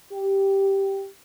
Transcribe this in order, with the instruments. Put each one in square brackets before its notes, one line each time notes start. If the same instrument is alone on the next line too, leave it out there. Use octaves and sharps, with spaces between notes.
[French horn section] G4